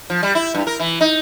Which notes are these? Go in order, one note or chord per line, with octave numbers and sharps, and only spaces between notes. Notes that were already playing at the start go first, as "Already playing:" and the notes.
F3
G3
E4
G2
A#4
E3
D#4